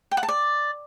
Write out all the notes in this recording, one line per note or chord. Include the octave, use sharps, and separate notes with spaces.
G5
F#5
A5
D5